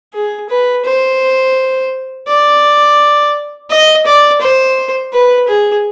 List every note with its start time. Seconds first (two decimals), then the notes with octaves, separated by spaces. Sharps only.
0.14 G#4
0.50 B4
0.85 C5
2.28 D5
3.71 D#5
4.06 D5
4.41 C5
5.13 B4
5.49 G#4